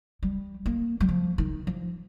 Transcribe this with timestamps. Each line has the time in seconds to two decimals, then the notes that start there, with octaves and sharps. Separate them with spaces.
0.23 G3
0.66 A#3
1.00 G3
1.09 F3
1.38 D#3
1.67 F3